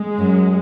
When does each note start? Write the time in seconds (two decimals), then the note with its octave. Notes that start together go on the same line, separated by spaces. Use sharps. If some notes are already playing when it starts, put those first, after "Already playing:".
Already playing: G#3
0.18 F#2